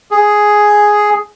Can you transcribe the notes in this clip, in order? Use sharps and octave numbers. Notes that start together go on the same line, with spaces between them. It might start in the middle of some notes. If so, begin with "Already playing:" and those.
G#4